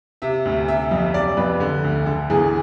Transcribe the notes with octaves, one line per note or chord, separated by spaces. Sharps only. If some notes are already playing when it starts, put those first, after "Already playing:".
C3 E5
D2
C3 E5
F2
C3 D5
F2 B4
D3
D2
D3 A4
E2 G#4